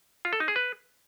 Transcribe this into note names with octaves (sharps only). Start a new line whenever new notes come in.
F4
A4
D#4
G#4
B4